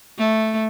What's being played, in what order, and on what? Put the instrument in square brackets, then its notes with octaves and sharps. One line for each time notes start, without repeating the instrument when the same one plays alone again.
[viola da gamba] A3